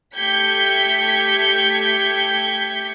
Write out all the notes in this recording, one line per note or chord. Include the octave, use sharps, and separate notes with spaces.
A3 G4 G6 G#6 B6 C#7